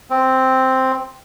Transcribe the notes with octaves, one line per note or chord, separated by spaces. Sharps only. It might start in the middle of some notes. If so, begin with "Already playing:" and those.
C4